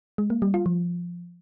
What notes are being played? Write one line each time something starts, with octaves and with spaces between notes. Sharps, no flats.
G#3
A#3
G3
F4
F3